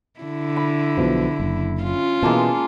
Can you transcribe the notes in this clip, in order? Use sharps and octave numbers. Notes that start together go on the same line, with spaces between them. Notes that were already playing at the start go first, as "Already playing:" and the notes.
D3 E4
B5
B1 B2 F3
F#1
C#4 F4
B2 E3 G#3 A#3 A5